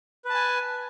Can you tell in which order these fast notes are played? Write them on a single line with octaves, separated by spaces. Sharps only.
B4 A5 G#5